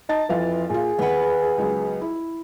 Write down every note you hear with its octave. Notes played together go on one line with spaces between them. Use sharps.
D#4 A5 A6
F2 E3 F4 F5
A#2 F4 G#4
D#2 B3 B4 F#5
C#2 F#3
E4